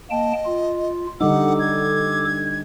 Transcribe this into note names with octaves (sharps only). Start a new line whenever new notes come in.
A#3 D#5 G5 A5
F4
D3 G3 D#4 A4 F#5 D6
G#6